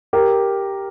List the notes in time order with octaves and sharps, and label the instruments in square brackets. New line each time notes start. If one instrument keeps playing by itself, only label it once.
[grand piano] G4 A#4